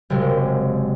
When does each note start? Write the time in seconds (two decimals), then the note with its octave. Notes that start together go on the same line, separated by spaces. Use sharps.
0.10 F#1 C3 G#3